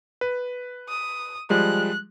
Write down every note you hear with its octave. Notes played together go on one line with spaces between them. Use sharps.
B4
D#6
F3 G3 G#3 F#6